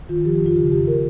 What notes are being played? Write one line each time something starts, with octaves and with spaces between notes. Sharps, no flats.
D#3 F4
F3 G4
G4
F2
F4
C#3 G4
F2 G4
A#4